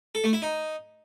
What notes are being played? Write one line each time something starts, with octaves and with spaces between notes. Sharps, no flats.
A4
A3
E4
D#4